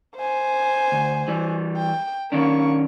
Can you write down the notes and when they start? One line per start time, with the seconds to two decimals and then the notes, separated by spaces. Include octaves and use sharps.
0.17 C5 G#5
0.92 D2
1.28 E3 G3
1.77 G5
2.32 D#3 A#3 C#4 D4 C#6